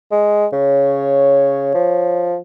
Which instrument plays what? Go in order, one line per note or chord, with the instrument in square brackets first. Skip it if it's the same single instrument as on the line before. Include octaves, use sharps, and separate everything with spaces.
[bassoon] G#3
[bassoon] C#3 [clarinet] C#5
[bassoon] F3